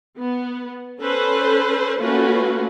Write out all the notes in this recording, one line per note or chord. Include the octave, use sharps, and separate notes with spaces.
B3
C#4 A4 B4 C5
A3 A#3 C#4 F4 F#4 B4